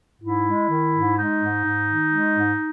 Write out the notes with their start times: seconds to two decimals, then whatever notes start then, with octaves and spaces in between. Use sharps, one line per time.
0.21 G#2 E4
0.45 G#3
0.69 D#3
0.93 G#2
1.16 G#3 D#4
1.40 G#2
1.64 G#2
1.88 D#3
2.11 G#3
2.35 G#2